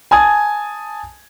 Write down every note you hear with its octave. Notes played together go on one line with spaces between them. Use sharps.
G#5 A5 D#6 G#6